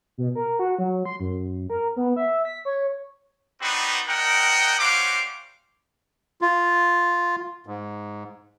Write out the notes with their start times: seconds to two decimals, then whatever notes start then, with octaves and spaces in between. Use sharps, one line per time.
0.18 B2
0.35 A#4
0.59 F#4
0.78 F#3
1.05 C6
1.20 F#2
1.70 A#4
1.96 B3
2.16 E5
2.45 B6
2.65 C#5
3.62 B3 C4 D4 D#4 F#4 B4
4.07 D4 A#4 D#5 F#5 G5
4.79 G3 C#4 F#4 C5 F5 D6
6.41 F4
7.67 G#2